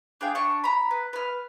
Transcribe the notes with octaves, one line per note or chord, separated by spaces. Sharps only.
D4 G#4 F5 G5
D4 C#6
A#5 B5
B4
B4 F6